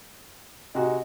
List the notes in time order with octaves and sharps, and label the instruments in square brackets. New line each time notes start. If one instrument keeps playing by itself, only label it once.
[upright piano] C3 D#4 F#4 [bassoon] G#3